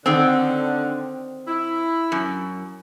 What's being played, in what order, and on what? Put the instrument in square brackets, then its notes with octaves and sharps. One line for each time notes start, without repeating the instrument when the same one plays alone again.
[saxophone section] D3 [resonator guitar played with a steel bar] D#3 C4
[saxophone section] E4
[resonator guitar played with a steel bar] F#2